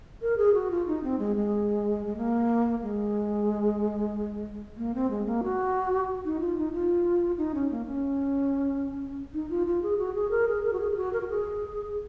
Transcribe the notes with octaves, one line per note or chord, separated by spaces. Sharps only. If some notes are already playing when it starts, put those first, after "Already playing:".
A#4
G#4
F#4
F4
D#4
C4
G#3
G#3
G#3
A#3
G#3
A#3
C4
G#3
A#3
F#4
D#4
F4
D#4
F4
D#4
C#4
A#3
C#4
D#4
F4
F4
G#4
F#4
G#4
A#4
G#4
A#4
F#4
G#4
G#4
F#4
A#4
F#4
G#4